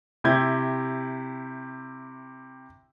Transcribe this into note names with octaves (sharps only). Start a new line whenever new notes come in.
C3 E4 G4 G6 G#6